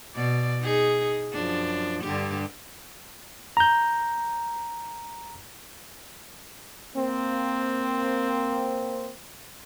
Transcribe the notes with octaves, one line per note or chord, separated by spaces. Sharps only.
B2 D5
D#4 G#4
F#2 F3 D4
G2 D3 G4
A#5 G6
A#3 C4